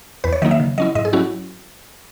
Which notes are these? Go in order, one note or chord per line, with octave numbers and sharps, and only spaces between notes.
E2 B4
C#5
D#3 F#3 A#3 D#4 D#5
E5
C#3
F#3 C#4 E4 D#5
G#2 D#5
G#4
F#3 C#4 E4 F#4